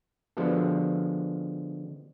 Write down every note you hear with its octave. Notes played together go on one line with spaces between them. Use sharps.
D3 F3 G#3 B3 F#4 A4